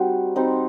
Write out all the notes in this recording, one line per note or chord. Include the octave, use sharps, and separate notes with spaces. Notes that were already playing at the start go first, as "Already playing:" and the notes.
Already playing: G3 C4 D#4 F#4
G3 C4 D#4